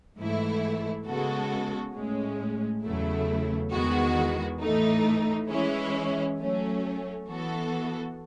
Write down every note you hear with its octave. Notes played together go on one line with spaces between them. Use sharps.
G#2 E3 A3 E4
C#3 G#3 B3 F#4 A4
A2 G#3 C#4
E2 C#3 F#3 A3 E4
E2 D#3 G#3 B3 F#4
A2 E3 A3 D#4
E3 G#3 C#4 E4
F#3 A3 C#4
E3 B3 F#4 A4